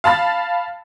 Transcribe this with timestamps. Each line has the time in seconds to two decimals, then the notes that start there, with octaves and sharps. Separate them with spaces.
0.04 F5 A5 B5 A6